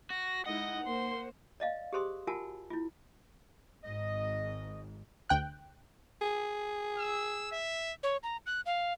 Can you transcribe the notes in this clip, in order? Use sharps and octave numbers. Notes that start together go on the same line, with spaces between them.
F#4 A#6
G#3 D#4 E4 D#5 F#5
A#3 C5 C6
D5 D#5 F5
G4 G#4 C5 C6 D#6
F4 F#4 A#4 F#5 G#5 A5
E4 F4
G#1 G#2 D#5
D2 G5 F#6
G#4
E6
E5
C#5
A#5
F#6
F5